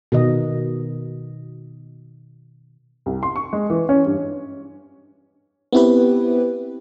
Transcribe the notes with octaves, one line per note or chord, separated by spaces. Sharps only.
B2 D#3 D#5
C2
C6
C#6
G#3
E3
C#4
G2
B3 C4 E4 G4 B4